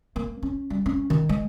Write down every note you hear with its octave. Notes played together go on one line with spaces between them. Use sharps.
A#3
C#4
G3
C#4
D#3
G#3